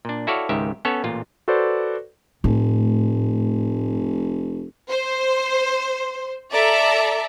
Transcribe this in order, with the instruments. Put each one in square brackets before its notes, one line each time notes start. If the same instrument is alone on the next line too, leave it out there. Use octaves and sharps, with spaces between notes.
[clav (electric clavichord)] A#2 D4
E4 F#4 A4 C#5 D5 F5
C#2 G#2 D#3 G4 E5
B3 C#4 A4 C#5
A1 A#2 F4
[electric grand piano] F#4 A4 B4 C5 D5
[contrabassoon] F1 [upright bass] A2
[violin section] C5
A4 D5 E5 A#5